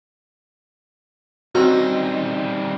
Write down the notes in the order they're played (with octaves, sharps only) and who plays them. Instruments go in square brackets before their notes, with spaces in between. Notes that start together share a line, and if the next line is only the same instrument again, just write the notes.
[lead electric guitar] G3 D#4 [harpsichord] C4 A#5 [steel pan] F#4